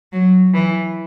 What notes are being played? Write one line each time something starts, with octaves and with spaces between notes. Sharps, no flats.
F#3
E3